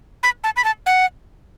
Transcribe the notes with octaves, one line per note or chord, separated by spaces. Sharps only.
B5
A5
B5
A5
F#5